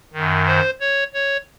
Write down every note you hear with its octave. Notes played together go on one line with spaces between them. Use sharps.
F#2 D#3
C5
C#5
C#5